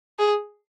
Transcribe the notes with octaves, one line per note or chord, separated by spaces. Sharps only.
G#4